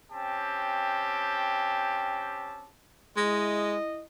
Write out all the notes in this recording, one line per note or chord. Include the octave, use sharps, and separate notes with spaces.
C4 C#4 G4 G5 A5
G#3 E4 D#5